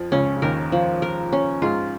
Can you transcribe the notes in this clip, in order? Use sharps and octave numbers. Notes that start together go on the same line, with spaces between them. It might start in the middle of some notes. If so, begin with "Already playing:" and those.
Already playing: F2 F3
C#2 C#3 C#4
C#3
D#2 D#3 A#4
F3
A#4
C#4
G#2 G#3 F4